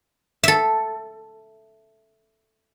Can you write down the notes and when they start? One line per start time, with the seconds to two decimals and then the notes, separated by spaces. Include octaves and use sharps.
0.44 A4 E5